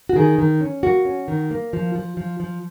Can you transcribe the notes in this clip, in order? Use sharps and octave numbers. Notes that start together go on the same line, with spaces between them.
F#4
D#3 G#4
D#3
C#4
A#3 F#4
C#4
D#3
A#3
F3
F3
F3
F3